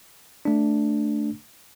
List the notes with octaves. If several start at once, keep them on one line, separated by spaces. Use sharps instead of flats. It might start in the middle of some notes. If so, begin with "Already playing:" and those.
A3 D4